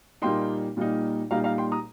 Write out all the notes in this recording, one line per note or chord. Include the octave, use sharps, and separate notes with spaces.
A#2 G3 A#3 D#4 G5 C6
A#2 G3 A#3 D#4
A#2 G3 A#3 D#4 F5 A#5
F5 A#5
G5 C6
A#5 D#6